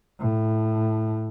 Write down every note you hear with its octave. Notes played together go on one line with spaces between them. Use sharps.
A2